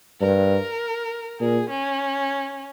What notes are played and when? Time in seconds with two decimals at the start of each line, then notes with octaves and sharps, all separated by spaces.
0.21 G2 A#4
1.40 A#2 G#4
1.70 C#4